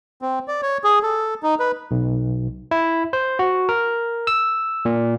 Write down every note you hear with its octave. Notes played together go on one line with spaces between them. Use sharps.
C4
D5
C#5
G#4
A4
D#4
B4
B1
E4
C5
F#4
A#4
E6
A#2